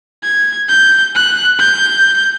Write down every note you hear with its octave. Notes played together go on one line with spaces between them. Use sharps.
G#6
G6
F#6
G6